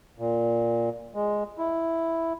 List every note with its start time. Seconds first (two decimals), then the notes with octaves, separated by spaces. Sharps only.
0.19 A#2
1.14 G#3
1.58 E4